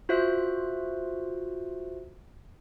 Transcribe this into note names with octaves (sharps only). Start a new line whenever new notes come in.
F4 F#4 C5 E5 F#6